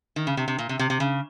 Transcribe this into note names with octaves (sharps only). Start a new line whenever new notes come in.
D#3
C#3
C3
C3
A#2
C3
C3
C3
C#3